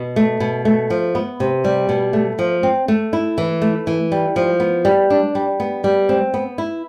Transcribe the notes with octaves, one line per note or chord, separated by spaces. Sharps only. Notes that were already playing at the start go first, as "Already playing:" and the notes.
Already playing: B2
A3
B2
A3
F3
B3
C3
G3
B2
A3
F3
C4
A3
E4
E3
A3
E3
G3
F3
B3
G3
D4
G3
B3
G3
C4
B3
E4